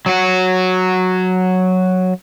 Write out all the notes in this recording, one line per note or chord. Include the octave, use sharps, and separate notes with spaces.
F#3 F#4